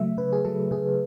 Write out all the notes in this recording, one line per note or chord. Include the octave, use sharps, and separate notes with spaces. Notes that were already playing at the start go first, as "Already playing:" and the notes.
Already playing: C#3 F#3 A3 E5
C#3 B4
G#4
F#3 A3 A4
C#3 G#4